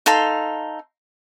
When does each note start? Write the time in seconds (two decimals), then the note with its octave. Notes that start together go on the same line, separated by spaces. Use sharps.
0.06 D#4 A4 F5 C6